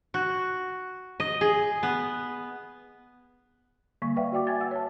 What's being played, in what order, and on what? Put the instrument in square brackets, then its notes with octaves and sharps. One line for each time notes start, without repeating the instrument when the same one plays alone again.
[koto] F#4
D#5
G#4
B3
[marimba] D3 G3 A#3 C#6
B4 D5 E5 F5 G5
F#4 D5 G5 D6
E5 G#5 G#6 A6
F#5 E6
C#5 A5